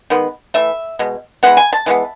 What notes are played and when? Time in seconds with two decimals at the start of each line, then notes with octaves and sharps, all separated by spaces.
0.10 D#3 G#3 B3
0.54 E3 A3 E5
0.99 B2 G#3
1.43 E3 G#3 B3 F#5
1.57 G#5
1.73 A5
1.86 E3 G#3 B3